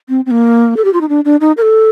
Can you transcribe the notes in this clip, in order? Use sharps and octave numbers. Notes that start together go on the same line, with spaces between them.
C4
C4
A#3
A4
G4
F4
D#4
D4
D4
D#4
A#4
A4